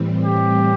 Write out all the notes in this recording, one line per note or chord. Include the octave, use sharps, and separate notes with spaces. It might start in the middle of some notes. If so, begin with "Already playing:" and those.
Already playing: A2 E3 G3 C4
G4